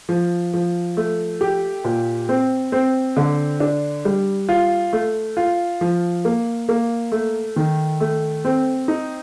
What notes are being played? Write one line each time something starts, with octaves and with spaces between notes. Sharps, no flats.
F3
F3
A3
G4
A#2
C4
C4
D3
D4
G3
F4
A3
F4
F3
A#3
A#3
A3
D#3
A3
C4
D#4